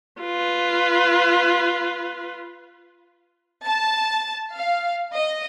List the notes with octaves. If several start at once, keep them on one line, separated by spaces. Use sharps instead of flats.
F4 B4
A5
F5
D#5